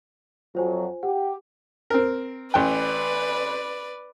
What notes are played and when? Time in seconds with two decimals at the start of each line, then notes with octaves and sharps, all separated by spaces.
0.55 F2 F#3 F4 C5 G#5
1.03 G4 F#5
1.90 C4 A#4
2.54 A1 B4 D5 G5